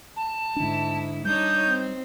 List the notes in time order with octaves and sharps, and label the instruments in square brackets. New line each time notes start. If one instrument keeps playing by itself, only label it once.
[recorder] A5
[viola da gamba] G#2 E4 [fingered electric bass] D3 D4
[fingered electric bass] G3 [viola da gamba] D4 D#4 C#5 [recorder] G6
[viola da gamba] C4